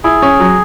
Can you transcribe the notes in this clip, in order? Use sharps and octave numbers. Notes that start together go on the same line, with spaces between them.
E4 G#4
C#4
F#3